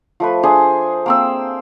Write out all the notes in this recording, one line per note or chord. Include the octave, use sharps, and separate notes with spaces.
F3 A3 B4
D4 G#4 C5 G#5
A#3 C4 E6